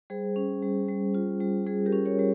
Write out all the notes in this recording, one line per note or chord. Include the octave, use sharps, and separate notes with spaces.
G3 G#4 C5
C#4
G3
G3
F4
G3
G3 G#4
G4 A#4
C#4
A#4 C#5
G3